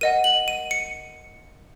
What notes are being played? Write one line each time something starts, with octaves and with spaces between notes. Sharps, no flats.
A#4 D#5 F#5 D#7
F#7
D#7
C#7